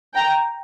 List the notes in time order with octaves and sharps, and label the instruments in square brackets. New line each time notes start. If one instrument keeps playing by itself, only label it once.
[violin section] G5 A#5